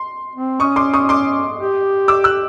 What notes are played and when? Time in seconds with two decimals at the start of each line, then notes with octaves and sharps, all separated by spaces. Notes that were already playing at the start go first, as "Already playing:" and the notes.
Already playing: C6
0.35 C4
0.60 C#4 C#6 D#6
0.76 C6 D6
0.94 C#6 D#6
1.09 C6 D6
1.59 G4
2.08 D6 E6
2.24 E6 F#6